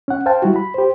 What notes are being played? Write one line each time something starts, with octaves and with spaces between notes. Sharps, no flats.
C#4 F#5
C5 F5 G5 A5
G3 E4 F#4
B5
G4 C5